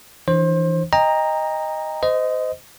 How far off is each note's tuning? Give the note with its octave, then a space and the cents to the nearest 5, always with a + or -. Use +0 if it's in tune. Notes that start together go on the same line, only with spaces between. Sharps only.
E3 +0 D4 +15 C5 +25
D#5 +0 G5 +35 A#5 +0
C5 -30 D#5 +5